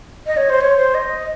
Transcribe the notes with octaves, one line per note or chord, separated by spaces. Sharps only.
D#5
C#5
C5
C#5
C5
D#5